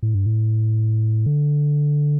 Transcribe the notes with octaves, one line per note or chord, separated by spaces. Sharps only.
A2
G2
A2
D3